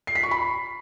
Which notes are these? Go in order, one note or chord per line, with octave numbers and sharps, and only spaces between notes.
C7
B6
C#6
B5